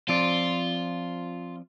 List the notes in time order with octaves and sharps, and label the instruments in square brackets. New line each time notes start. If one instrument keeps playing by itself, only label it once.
[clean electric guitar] F3 C4 D5 [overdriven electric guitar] F4